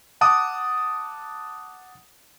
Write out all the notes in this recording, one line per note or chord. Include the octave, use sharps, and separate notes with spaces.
F#5 A5 D6 D#6